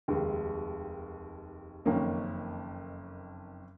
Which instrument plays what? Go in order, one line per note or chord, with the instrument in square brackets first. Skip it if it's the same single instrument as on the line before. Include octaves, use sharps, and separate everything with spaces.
[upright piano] F1 D#2 D#3 G#3
F#1 F2 D#3 A#3 C#4